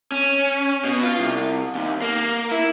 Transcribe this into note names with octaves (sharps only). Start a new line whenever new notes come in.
C#4
B2
F4
C2
D#2
A#3
E4